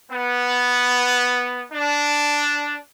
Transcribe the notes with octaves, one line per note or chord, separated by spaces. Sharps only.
B3
D4